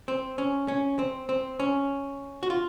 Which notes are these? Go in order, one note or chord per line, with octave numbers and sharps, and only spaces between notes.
C4
C#4
C#4
C4
C4
C#4
F#4
F4